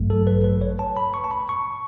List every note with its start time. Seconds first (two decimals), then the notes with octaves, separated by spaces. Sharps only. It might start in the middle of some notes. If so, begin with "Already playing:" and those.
Already playing: A1 G2 F#3 A3
0.10 A4
0.27 B4
0.44 B4
0.61 C#5
0.79 A5
0.97 B5
1.14 C#6
1.24 A5
1.31 B5
1.49 C#6